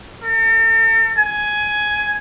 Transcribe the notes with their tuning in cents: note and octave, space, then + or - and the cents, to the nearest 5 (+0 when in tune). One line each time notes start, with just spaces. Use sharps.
A4 +45
G#5 +10